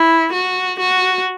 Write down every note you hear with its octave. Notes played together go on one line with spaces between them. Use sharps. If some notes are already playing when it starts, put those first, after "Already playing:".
Already playing: E4
F#4
F#4